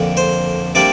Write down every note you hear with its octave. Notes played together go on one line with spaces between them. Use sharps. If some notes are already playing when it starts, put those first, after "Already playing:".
Already playing: F2 D3 A#3 D4
C5 C6
C3 G3 A#3 D4 D5 D6